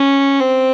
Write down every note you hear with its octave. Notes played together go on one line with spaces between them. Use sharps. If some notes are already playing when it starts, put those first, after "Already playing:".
Already playing: C#4
C4